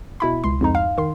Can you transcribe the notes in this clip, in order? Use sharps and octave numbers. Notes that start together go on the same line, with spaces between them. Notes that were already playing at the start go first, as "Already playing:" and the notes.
B2 E4 B5
C#2 C6
F2 G#2 D#4
F5
D#3 C6